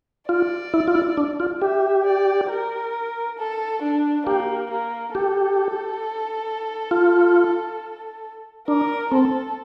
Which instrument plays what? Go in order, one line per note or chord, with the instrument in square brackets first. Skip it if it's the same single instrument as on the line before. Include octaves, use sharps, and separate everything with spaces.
[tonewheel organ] F4 [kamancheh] D5
[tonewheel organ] E4
F4
E4
D4
F4
[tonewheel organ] G4 [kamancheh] E5
[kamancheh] D5
A#4
A4
D4
[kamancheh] A#3 [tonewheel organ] G4
[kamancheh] A#3
[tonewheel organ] G4 [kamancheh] A4
[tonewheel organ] F4
[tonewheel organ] D4 [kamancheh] A#4
[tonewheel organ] C4 [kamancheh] A4